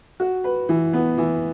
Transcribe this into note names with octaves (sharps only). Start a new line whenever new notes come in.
F#4
B4
E3
B3
E3